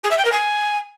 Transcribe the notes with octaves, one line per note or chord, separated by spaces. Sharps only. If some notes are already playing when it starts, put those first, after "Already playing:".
G#4
E5
G5
A#4
G#5